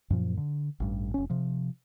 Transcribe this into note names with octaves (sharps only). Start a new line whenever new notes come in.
F#2 A#2 F3
D3
A1 G2
F1 C#4
C3 F3